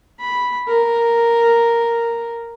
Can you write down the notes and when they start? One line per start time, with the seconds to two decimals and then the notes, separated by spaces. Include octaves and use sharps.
0.20 B5
0.68 A#4